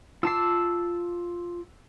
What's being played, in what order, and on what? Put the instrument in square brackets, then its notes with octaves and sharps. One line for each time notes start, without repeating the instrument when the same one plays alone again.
[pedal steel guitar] F4 A5 D6 [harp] E6 C7